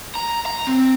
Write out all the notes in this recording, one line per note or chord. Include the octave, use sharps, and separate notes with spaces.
A#5
A#5
C4